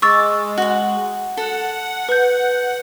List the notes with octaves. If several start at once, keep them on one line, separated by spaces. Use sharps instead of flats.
G#3 C#6 D6 E6 A6
F#4 F#5
A4 F#5
B4 G6